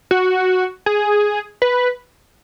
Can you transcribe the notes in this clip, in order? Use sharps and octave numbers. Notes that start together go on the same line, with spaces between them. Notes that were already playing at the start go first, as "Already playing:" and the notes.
F#4
G#4
B4